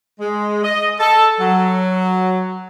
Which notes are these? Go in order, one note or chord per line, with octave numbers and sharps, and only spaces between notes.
G#3
D#5
A4
F#3